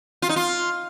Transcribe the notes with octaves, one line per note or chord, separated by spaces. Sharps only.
F4
D#4
F4